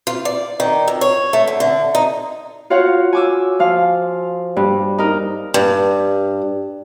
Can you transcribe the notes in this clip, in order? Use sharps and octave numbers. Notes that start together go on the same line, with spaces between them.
F4
D5
D#3
F2
C#5
A3
D3
D3
D#4
F4 F#4 C#5 F5 F#5
G#5 D6 E6
F3 F5
G2
D#4 A#4
G2